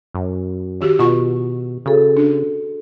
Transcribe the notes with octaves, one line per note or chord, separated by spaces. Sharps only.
F#2
D#3 F#4 G4
B2 F4 C#6
C#3 F#4 G#4 A4
D4